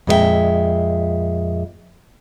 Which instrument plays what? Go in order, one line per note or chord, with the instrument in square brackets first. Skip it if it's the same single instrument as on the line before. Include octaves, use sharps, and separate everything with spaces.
[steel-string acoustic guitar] F2 A#2 G#3 E4 E5 G5